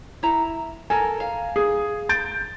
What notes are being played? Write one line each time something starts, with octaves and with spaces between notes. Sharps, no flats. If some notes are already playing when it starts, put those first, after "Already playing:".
E4 A#5
A4 A#4 G#5 A#5
F5
G#4
G6 A6 D7